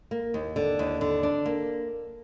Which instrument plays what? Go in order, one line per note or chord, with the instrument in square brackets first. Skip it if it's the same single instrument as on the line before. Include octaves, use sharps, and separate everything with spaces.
[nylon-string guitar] A#3
D#2
D3
D#2
D3
D4
A#3